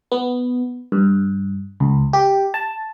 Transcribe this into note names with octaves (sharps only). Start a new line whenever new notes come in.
B3
G2
C#2
G4
A5